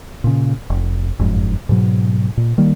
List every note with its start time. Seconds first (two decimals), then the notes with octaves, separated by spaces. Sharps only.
0.24 A#2 C#3
0.70 F1
1.19 F#1 F2 G#2
1.69 G#2 B2 F#3
2.37 A#2
2.58 D#3 G3 A#3